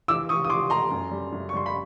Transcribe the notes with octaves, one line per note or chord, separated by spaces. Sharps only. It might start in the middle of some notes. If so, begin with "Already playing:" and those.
E3 D6 E6
E3 C#6 D#6
D#6
E3 C6 D6
A3 A#5 C6
F#2
G3
F#2
C#6
G3 C6
B5